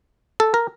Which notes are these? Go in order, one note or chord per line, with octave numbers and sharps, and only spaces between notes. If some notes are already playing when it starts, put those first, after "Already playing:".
A4
A#4